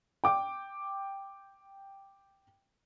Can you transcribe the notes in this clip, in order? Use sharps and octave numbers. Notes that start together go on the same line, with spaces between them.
G5 D6